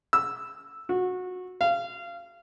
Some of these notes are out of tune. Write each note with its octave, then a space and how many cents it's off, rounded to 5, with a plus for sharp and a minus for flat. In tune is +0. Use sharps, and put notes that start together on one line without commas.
E6 -5
F#4 -20
F5 -25